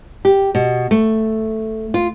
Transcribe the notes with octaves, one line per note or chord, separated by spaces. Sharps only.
G4
B2
A3
F4